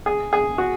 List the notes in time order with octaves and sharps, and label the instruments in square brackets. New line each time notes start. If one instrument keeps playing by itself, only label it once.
[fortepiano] G#4
G#4
F#4